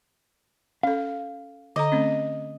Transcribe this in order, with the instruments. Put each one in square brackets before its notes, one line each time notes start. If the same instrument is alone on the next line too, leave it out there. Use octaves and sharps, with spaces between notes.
[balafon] C#4 A4 [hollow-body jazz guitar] F5
[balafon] D3 A4 A#5 [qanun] D#5
[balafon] A3 C4 C#4